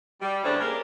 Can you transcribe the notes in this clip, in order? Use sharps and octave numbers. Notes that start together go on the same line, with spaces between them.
G3
E2 C#3 G3 A3 D4 C5
A#3 C#4 G4 G#4 A#4